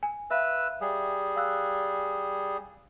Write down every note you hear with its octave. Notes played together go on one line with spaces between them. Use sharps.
G#5
B4 E5 F5 E6
G3 G#4
F5 E6 F#6